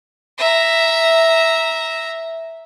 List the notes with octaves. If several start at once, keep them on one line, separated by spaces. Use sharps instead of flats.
E5 A#5